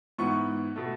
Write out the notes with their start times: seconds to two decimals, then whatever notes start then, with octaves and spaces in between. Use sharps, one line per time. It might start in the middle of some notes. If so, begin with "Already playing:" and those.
0.18 G#2 E3 B3 C#6
0.76 B2 A3